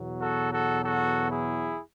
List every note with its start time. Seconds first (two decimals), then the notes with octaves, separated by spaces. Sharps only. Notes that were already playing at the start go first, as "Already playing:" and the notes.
Already playing: E2 B2 F#3
0.19 F#4 A4
0.51 F#4 A4
0.82 F#4 A4
1.29 E4 G#4